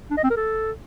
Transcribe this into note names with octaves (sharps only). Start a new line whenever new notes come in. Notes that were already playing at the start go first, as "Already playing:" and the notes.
D4
D#5
C4
A#4
A4